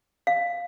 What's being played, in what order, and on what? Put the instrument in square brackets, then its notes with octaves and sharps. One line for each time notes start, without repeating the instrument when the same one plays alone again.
[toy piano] F5